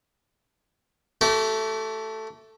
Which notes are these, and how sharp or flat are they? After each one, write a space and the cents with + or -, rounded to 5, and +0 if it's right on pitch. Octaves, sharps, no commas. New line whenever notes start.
A3 +0 G4 -40